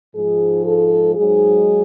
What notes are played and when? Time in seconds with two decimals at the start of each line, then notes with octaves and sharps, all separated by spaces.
0.15 G#2 F3 G#4
0.65 A4
1.15 G#2 F#3 G#4